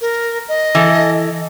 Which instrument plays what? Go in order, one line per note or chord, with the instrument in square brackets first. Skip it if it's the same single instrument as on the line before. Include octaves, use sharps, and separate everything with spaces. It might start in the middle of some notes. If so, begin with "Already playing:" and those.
[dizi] A#4
D#5
[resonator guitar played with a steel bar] E3 A4